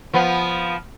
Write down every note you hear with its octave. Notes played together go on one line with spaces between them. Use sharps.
F3 B3